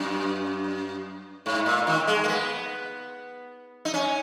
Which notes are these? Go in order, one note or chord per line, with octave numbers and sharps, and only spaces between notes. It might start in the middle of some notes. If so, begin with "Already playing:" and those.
Already playing: F#2
G#2
A#2
D#3
G#3
A#3
B3
D#4
C#4